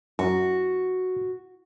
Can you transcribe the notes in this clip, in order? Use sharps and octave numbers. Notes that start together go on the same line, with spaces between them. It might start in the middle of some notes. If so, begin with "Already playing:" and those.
F#2 F#4